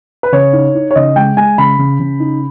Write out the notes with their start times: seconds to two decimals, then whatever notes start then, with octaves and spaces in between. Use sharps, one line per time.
0.23 B4
0.32 C#3 C#5
0.53 D#4
0.75 D#4
0.91 C#5
0.96 C#3 D#5
1.16 G#3 G5
1.37 G#3 G#5
1.58 C#3 B5
1.79 C#3
2.00 C#3
2.20 D#4